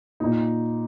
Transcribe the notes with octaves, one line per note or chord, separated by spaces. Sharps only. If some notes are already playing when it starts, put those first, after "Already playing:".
A#2 D#4